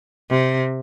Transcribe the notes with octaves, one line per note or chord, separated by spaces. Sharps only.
C3